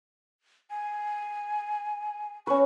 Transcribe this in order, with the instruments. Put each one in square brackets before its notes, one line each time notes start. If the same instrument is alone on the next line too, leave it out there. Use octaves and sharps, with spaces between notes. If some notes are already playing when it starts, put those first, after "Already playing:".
[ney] G#5
[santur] C#4 B4 [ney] C#6